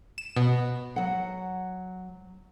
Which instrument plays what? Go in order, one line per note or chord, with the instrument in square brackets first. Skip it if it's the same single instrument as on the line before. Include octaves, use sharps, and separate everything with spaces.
[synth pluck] E7
B2
[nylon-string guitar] F#3 F#5